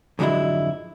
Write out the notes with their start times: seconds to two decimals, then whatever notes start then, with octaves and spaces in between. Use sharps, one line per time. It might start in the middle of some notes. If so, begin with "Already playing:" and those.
0.19 F2 G#2 D3 F#3 G#3 E4